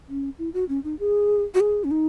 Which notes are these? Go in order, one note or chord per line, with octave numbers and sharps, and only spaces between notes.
C#4
E4
F#4
C#4
D#4
G#4
F#4
G#4
C#4
D#4